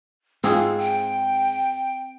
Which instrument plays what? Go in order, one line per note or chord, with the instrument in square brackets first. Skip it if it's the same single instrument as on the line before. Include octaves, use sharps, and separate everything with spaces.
[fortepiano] G#2 F4 [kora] C4 G#4 [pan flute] E6
[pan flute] G5